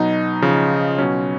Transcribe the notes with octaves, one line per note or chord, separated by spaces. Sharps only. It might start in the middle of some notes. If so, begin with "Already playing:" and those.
Already playing: B2 F#3 D#4
C#3 F3
B2 F#3 C#4